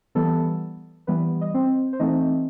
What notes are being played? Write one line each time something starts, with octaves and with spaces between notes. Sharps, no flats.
E3 G3 B3 A4
E3 G3 B3 B4
D#5
C4 C5
C5
E3 A3 C4 D#4 D#5